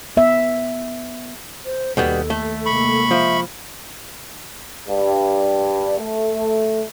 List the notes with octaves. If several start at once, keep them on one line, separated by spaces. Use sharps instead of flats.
B3 E5
C5
D#2 B2 G3 B3 A4
A3
C3 G#3 A#3 B5 C#6
F3 E5
G2
A3